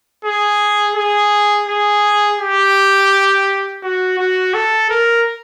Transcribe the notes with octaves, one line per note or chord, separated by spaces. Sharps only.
G#4
G#4
G#4
G4
F#4
F#4
A4
A#4